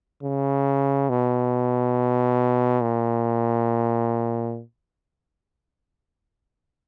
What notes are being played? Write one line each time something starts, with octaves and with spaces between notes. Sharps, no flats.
C#3
B2
A#2